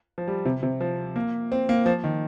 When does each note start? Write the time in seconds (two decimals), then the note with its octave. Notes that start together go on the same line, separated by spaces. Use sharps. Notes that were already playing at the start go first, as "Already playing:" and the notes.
0.18 F3
0.28 G3
0.45 C3
0.63 C3
0.81 F3
1.16 A#3
1.52 C4
1.69 A#3
1.86 F3
2.04 D#3